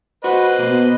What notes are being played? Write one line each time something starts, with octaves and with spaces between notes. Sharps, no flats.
F#4 B4 C5 D#5
B2 A#3